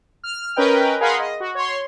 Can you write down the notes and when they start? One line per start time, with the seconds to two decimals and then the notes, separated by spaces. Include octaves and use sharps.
0.24 F6
0.56 C#4 A#4 B4 D#5 G5
1.00 G#4 A#4 F5 F#5 B5 C6
1.20 D#5
1.40 F#4
1.55 C#5 C6